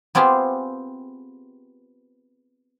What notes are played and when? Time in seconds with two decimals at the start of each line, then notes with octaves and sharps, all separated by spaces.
0.15 B3 C4 F4 G4 G#4